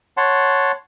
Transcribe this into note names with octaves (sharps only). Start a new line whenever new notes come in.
C#5 F#5 A5 C6